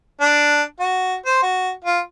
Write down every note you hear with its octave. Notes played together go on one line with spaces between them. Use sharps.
D4
F#4
C5
F#4
F4